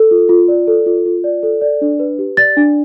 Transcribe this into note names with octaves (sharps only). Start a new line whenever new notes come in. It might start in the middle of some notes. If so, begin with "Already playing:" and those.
Already playing: A4
F4
F4
D5
A4
F4
F4
D5
A4
D5
D4
B4
G4
D5 A6
D4